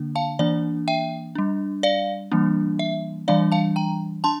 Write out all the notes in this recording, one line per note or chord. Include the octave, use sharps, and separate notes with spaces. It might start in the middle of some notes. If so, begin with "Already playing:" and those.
Already playing: D3 A#3 D4
F5 A5
E3 A#3 D4 D5
E5 G5
G3 D4
D5 F5
E3 G3 A#3 D4
E5
E3 G3 D4 D5 F5
F5 A5
G5 A#5
D4 A5 C6